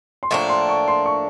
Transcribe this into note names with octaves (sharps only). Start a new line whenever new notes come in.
C6
A2 F3 A#3 D4 C#6
C6
C#6
C6
C#6